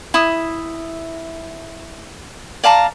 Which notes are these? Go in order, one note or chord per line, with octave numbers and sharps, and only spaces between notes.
E4 D#6
D5 F5 A5 A#5